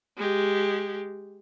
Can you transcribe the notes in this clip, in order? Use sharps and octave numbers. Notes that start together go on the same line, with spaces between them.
G#3 G4